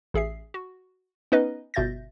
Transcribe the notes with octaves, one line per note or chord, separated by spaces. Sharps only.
A1 G#4 E5 C7
F#4
B3 C#4 D#4 B4 D#5
G1 B2 E5 G6 A6 A#6